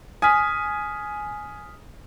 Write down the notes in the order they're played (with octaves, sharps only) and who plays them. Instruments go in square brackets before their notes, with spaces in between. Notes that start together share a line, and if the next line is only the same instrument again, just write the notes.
[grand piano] G#5 [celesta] D#6 F6 B6